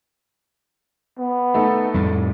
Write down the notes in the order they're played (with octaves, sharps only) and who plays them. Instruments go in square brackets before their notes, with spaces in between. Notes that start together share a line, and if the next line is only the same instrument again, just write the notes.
[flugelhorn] B3
[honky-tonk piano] A3 D#4 A4
[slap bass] F2 A2 G3